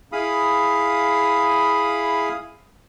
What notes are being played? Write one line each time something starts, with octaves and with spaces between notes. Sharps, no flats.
E4 G#4 F5 B5 D#6